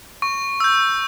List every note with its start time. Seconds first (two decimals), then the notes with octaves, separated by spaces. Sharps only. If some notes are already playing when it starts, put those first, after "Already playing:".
0.22 C#6
0.60 E6 G6